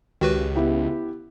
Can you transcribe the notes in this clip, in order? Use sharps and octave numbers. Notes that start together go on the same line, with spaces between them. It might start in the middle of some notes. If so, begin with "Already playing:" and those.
C#2 D#3 F#4 G4 B4
B3 E4 G4